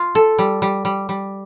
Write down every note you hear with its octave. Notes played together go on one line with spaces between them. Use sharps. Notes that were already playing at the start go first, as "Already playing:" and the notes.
Already playing: F4
A4
G3
G3
G3
G3